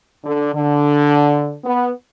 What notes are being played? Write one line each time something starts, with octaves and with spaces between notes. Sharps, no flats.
D3
D3
B3